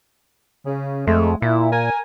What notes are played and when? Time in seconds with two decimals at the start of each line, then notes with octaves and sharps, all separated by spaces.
0.66 C#3
1.07 F2 G#3 A3
1.42 A#2 E4
1.71 A#4 G#5